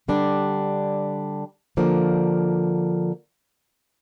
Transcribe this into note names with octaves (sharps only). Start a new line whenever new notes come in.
D3 G3 D4
D3 F3 A#3 D4